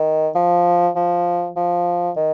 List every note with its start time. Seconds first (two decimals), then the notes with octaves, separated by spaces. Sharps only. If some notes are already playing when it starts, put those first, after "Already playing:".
Already playing: D#3
0.35 F3
0.96 F3
1.56 F3
2.16 D#3